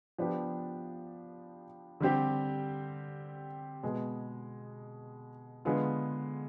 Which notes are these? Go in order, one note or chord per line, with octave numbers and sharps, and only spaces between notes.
F3 B3 D4 G4
D3 G3 C4 G4
B2 G#3 B3
D3 G#3 B3 F4